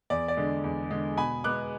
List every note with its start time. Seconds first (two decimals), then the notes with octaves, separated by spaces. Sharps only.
0.10 E2 D5
0.28 D5
0.37 D3 G#3
0.64 E2
0.91 D3 G#3
1.17 B2 G#5 B5
1.44 G#3 B3 D6 F#6